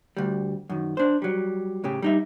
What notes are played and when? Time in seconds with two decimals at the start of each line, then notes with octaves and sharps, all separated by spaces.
0.17 D2 G3
0.70 F#2 D#3
0.97 D4 C5
1.22 F#3 G3
1.84 A2 C#3 G4
2.02 G3 D#4 E5